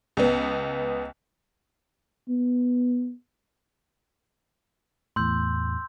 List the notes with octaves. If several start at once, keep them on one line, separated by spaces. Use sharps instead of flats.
C#2 B3
B3
E2 A2 C6 E6 G6